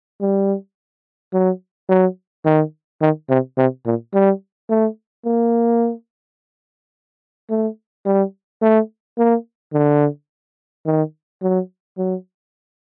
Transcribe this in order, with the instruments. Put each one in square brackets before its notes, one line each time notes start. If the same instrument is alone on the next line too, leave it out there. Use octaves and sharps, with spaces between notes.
[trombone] G3
F#3
F#3
D#3
D#3
C3
C3
A#2
G3
A3
A#3
A3
G3
A3
A#3
D3
D#3
F#3
F#3